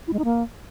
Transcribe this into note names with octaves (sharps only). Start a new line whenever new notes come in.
E4
G#3
D#4
A#3